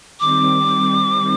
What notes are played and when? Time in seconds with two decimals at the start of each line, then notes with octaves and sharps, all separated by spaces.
0.20 D#3 G3 C4 D6